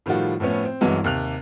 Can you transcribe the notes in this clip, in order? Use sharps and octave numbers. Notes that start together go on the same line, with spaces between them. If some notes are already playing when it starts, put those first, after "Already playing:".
A2 D#3 F3 G3 F4 F#4
A2 F3 A3 B3 C#4
C4
C2 G2 E3 F#3 G#3 B3
D#2 C3 F#6 F7